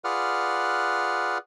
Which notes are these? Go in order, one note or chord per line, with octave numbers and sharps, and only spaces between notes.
F4 G#4 B4 D5 F#5 F6